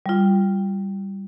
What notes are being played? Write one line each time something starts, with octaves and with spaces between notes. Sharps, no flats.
G3 F4